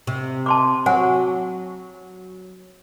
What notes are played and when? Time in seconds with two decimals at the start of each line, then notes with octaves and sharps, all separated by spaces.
0.07 C3
0.46 A5 C6 D6
0.86 F#3 C5 F#5 G#5